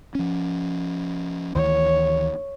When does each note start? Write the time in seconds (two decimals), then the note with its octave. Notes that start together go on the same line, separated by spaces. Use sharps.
0.15 F3 C#4
1.55 D2 D#3 E3 C#5